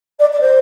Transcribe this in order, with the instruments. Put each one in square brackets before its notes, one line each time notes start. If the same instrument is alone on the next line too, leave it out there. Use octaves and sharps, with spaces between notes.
[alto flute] D5
D5
C5